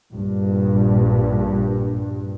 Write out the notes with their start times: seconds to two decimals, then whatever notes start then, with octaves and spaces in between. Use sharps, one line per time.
0.12 A#1 G2